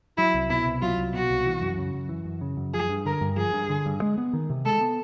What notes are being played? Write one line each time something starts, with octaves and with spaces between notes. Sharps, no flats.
F#3 E4
C2
B2 E4
C2
F#3 F4
C2
B2 F#4
C2
E3
F#2
C#3
F#2
E3
F#2
C#3
F#2
F3 G#4
G2
D3 A#4
G2
F3 G#4
G2
D3
G2
G#3
B3
D#3
C3
G#3 A4
B3